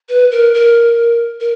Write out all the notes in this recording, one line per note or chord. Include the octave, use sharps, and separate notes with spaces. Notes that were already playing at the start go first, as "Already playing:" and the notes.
B4
A#4
A#4
A#4